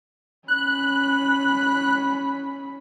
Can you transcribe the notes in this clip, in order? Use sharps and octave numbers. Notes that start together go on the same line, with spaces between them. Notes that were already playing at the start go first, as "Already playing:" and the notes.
C#4 B5 F#6